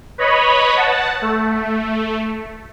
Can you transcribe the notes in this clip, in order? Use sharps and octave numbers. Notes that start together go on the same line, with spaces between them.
B4 C#5 D#5 B5
F#5 A5
A3